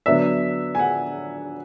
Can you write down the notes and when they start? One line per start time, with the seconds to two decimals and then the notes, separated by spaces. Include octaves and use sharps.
0.06 D3 F#3 B3 D4 E5
0.75 G#5
0.79 F#5